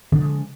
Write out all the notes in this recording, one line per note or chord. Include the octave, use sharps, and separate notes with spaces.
C#3 F3 G#3 D4